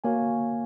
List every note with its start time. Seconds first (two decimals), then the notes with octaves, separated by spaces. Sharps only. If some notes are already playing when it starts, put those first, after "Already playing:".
0.04 A#3 F#4 C#5 F5 G#5